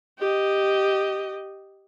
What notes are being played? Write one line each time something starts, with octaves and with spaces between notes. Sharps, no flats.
G4 D#5